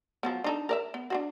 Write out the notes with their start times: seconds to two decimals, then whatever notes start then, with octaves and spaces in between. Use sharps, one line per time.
0.23 F3 F#3 B3
0.44 D4 D#4 A4
0.69 A#4 D5 E5
0.94 B3
1.10 D4 F4 F#4